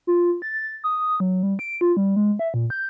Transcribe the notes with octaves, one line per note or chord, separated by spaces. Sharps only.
F4
A6
D#6
F#3
G3
D7
F4
G3
G#3
E5
A#2
G6